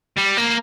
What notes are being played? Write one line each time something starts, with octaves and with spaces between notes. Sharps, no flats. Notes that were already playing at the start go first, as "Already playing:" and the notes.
G3
A#3